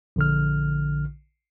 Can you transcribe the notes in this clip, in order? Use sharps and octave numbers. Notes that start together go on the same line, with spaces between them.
A#1 D3 F6